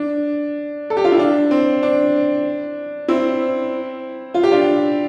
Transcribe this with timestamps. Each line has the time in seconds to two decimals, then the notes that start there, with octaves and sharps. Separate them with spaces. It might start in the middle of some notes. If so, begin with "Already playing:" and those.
Already playing: D4
0.90 A4
0.97 G4
1.04 F4
1.12 E4
1.19 D4
1.51 C4
1.83 D4
3.08 C4 E4
4.34 F4
4.43 G4
4.52 D4 F4